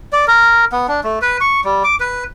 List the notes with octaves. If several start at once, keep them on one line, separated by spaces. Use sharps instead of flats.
D5
A#4
B3
D4
A3
B4
C#6
G3
D6
B4